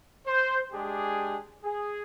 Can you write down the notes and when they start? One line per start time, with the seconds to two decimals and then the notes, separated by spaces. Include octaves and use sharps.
0.27 C5
0.72 G#3 D4 G4 G#4
1.64 G#4